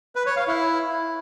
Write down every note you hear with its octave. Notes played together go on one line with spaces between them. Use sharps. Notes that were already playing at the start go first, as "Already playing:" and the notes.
B4
C#5
F5
E4